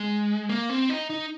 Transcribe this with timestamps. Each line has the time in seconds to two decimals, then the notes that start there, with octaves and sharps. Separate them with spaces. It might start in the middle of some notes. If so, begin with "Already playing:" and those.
Already playing: G#3
0.49 A#3
0.69 C4
0.89 D#4
1.10 D#4